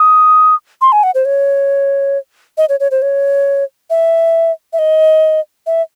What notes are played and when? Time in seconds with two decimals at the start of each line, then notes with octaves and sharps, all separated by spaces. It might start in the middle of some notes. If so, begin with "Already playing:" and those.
Already playing: D#6
0.81 C6
0.92 G#5
1.03 F#5
1.15 C5
1.25 C#5
2.58 D#5
2.69 C#5
2.80 C#5
2.91 C5
3.02 C#5
3.90 E5
4.73 E5
4.79 D#5
5.67 E5